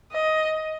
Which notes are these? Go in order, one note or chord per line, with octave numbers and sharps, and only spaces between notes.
D#5